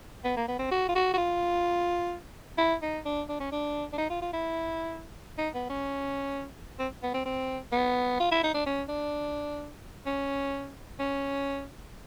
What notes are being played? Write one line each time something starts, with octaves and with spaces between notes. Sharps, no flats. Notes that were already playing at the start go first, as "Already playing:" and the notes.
B3
A#3
B3
C4
F#4
F4
F#4
F#4
F4
E4
D#4
D4
D4
C#4
D4
D4
D#4
F4
F4
E4
D#4
B3
C#4
C4
B3
C4
C4
B3
F4
E4
D#4
D4
C#4
D4
C#4
C#4